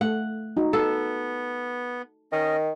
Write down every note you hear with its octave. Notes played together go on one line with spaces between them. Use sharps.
A3 F#5
D#4 F#4
B3 A4
D#3 C#4 D#5